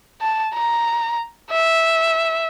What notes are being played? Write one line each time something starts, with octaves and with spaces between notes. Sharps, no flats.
A5
A#5
E5